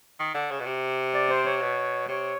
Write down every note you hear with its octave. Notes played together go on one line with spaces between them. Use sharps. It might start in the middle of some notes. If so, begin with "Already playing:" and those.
D#3
D3
C#3
B2
C3
D5
C5
C#5
B2
C3 C#5